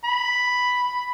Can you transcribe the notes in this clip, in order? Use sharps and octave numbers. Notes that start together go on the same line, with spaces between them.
B5